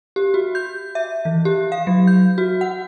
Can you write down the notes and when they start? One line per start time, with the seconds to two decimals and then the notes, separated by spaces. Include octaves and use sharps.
0.16 G4
0.34 F#4
0.55 G6
0.95 E5
1.25 E3
1.45 G4
1.72 F5
1.87 F#3
2.07 G6
2.38 F#4
2.61 F#5